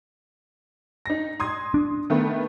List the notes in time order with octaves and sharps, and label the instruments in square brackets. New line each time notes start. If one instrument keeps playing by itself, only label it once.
[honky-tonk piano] D#4 A#6
C6 D#6 G#6
[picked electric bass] D4
[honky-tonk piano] D#3 A3 B3